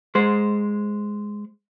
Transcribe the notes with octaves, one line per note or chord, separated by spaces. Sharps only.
G#3 C5